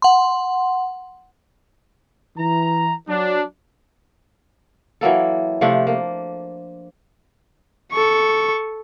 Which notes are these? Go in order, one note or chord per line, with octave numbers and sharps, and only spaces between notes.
F#5 C6
E3 A#5
F#3 D4
E3 F#3 A#3 A4
C3 F3 A3 D4
A#3
A4 C#6